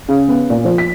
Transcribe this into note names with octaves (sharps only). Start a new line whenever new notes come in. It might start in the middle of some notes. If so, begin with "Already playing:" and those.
C#3
B3
A#2
F3
B6